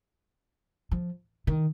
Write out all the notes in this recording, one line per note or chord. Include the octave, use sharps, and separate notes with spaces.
F3
D#3